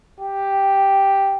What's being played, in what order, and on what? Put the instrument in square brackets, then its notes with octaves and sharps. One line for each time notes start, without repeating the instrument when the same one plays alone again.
[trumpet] G4